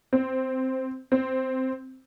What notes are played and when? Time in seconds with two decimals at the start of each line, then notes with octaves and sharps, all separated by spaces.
0.13 C4
1.12 C4